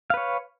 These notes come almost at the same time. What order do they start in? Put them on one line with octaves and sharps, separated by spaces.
F5 B4 C#5